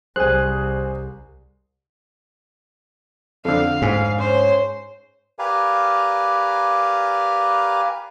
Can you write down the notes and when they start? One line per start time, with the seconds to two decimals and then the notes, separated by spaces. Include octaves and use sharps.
0.16 C2 G#4 C5 G#5 F#6
3.45 F2 D3 F5
3.82 G#2 G#4 G#5 B5
4.18 C#4 C5
5.39 G4 A#4 B4 D5 F5 G#5